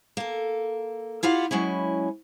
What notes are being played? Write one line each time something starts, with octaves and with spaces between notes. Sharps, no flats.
A#3 A4
E4 F4 G4 F5 F#5
F#3 G#3 C#4 E4